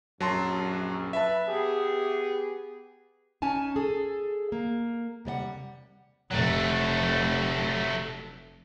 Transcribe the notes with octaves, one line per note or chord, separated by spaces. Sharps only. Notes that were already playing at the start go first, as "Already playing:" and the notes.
A#1 F#2 F#3 A5 C6
B4 E5 A5
B3 G4 G#4
C#4 D#4 G#5 A5
G#4 A4
A#3
C3 G3 D5 F#5
F1 F#3 A3